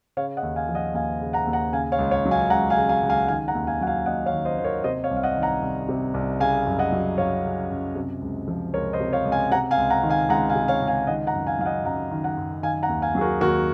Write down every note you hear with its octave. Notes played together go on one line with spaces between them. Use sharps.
C#3 C#5 F5
D#5 F#5
D#2
F5 G#5
F3
D#5 F#5
D#2 F5 G#5
C#3
F#5 A#5
D#2
F#5 A#5
C#3 F5 G#5
C#5 F5
C#2
C#5 F5
F#3
F5 G#5
C#2 F#5 A#5
F5 G#5
C#3
F5 G#5
C#2
F5 G#5
D#3 F5 G#5
F#5 A#5
D#2
F5 G#5
F#3 F#5
F5 G#5
D#2 D#5 F#5
C#5 F5
D#3
C5 D#5
D#2 C5
A#4 C#5
C3 C5 D#5
C#5 F5
C2
F5
D#5 F#5
D#3
F#5 A#5
C2
C3
C2
C#3 F5 G#5
F#2
D#5 F#5
F#3
F#2 C#5 F5
C#3
F#2
C3
C#2
F3
C#2 A#4 C#5
C5 D#5
C3
C#5 F5
C#2
F5 G#5
C3 F#5 A#5
F5 G#5
C#2
F#5 A#5
D#3
F5 G#5
C#2 F#5 A#5
F5 G#5
C3
C#5 F5
C#2
F5 G#5
D#3 D#5 F#5
F#5 A#5
F#2
F5 G#5
F#3 F5
D#5 F#5
F#2 F#5 A#5
D#3
F#5 A#5
F#2
D#3 F5 G#5
F#5 A#5
D#2
F5 G#5
F#3 G#4
F#4 A#4
D#2 F#4 A#4